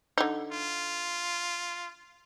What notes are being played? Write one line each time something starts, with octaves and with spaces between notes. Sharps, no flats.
D3 D#4
F4